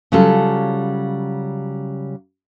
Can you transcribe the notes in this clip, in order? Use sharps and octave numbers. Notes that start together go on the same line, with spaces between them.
C#3 F#3 G3 C#4 F4 A4